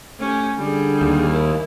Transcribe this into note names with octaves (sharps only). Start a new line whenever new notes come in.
A3 C#4 G4
D3 G3 G#4
D#2
E4 A#4